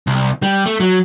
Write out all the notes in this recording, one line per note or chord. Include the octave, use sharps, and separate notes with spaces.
C2
G3
A3
F#3